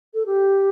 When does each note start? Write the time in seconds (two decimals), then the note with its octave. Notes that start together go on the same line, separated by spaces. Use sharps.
0.14 A4
0.26 G4